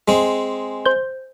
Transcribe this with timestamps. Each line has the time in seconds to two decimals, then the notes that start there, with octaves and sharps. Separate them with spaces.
0.08 G#3 C4
0.85 C5 G6